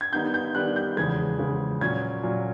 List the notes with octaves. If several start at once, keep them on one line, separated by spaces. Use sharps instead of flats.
G#6
D#3 G3 B3 D#4 G6
G6
D#3 G3 B3 D#4 F#6
G6
E2 C#3 F3 G#3 G#6
E2 C#3 F3 G#3
A#2 F#3 A#3 C#4 G#6
A#2 F#3 A#3 C#4